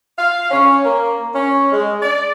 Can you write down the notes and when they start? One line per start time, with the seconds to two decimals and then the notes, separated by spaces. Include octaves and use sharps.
0.18 F5
0.51 C#4
0.85 A#3
1.35 C#4
1.72 G#3
2.02 D5